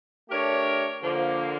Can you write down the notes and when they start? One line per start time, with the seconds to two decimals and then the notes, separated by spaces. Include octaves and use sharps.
0.29 A3 D4 G4 A#4 C#5
1.02 D3 F3 A#3